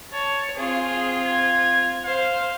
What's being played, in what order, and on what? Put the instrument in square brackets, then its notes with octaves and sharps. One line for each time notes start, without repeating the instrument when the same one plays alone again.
[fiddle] C#5 [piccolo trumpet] A5
[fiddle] C4 F4 [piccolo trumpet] G#4
[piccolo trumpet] G#6
[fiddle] C5 [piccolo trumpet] F5